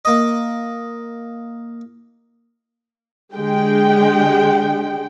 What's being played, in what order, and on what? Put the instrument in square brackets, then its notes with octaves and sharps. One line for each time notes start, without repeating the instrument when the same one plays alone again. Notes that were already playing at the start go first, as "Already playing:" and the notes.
[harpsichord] A#3 D#5
[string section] D3 G#3 G4 G5